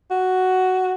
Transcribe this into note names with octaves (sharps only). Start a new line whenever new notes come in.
F#4